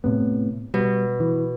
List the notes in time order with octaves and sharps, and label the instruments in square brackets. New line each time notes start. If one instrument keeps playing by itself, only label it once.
[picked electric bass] A2 C3 B3
[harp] B2 [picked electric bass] G3
[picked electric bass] E3